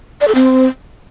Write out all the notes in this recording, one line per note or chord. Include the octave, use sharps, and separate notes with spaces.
D5
A4
C4